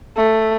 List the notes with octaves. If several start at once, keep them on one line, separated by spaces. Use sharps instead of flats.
A3